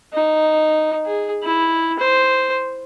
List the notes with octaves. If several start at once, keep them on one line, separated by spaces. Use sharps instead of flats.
D#4
G#4
E4
C5